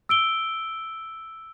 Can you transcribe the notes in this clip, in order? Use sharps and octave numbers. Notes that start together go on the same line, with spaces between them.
E6 D7 G7